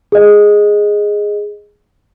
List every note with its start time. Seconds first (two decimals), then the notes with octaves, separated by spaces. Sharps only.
0.12 G#4 D#5